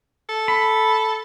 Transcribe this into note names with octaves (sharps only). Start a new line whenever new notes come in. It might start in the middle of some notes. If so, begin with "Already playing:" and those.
A4
B5